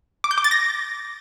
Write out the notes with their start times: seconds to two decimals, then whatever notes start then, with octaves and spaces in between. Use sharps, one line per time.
0.24 D6
0.31 G6
0.38 D6
0.44 A6
0.51 A#6